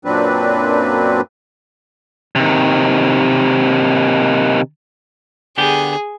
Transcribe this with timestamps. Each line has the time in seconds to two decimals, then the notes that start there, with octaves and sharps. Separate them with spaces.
0.05 F#2 A#2 F#3 C4 D4 B4
2.35 C3 D#3
5.58 D3 B3 G4 G#4